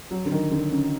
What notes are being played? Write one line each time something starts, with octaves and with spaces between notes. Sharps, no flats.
F#3
D3
D#3
D3
C#3